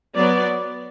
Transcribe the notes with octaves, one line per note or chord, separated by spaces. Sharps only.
F#3 B3 D5